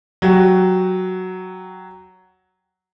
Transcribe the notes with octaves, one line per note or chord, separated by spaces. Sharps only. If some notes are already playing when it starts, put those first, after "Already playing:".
F#3 F#4 G4